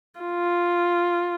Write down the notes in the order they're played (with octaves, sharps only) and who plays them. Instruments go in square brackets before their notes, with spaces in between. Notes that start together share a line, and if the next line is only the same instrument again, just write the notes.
[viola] F4